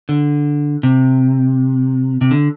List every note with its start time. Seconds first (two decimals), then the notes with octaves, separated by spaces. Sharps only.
0.09 D3
0.83 C3
2.21 C3
2.31 D3